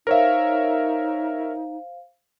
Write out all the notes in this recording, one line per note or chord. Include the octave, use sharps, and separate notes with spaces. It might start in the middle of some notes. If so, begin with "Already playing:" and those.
D#4 A#4 C5 C#5 E5 F5